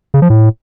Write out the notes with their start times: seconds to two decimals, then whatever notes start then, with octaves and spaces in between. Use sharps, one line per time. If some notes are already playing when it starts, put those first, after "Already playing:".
0.14 C#3
0.22 F3
0.30 A2